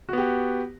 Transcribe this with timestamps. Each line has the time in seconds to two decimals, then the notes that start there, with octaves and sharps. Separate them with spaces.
0.09 F#4
0.13 B3
0.18 G4